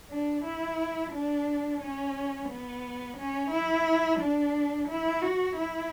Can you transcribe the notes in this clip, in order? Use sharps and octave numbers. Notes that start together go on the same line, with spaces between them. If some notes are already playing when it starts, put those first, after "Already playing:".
D4
E4
D4
C#4
B3
C#4
E4
D4
E4
F#4
E4